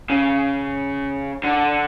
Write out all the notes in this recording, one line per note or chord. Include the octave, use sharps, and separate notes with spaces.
C#3
D3